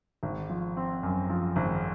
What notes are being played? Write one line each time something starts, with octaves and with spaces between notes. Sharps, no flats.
G#1
F3
C4
F#2
F3
G#1